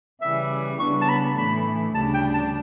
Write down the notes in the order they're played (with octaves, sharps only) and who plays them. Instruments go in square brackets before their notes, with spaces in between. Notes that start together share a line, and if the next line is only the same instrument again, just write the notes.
[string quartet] C#3 E3 G3 [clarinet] E5
[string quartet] C#3 G3 B3 D4 [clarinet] C#6
[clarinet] A5
B5
[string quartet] A2 E3 A3 [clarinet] B5
[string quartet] D2 C#3 G3 D4 [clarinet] A5
[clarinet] G5
A5